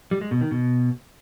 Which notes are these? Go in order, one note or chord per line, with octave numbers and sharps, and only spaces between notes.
G3
G#3
B2
D#3
B2